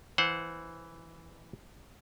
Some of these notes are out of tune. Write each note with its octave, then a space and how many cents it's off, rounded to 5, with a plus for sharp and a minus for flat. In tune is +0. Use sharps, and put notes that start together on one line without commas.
E3 +0 C5 +0 F#5 -25